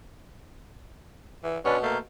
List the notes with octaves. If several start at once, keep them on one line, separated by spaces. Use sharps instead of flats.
E3
B2 C#4 D4 B4 D5
A3 A#3 F5 G6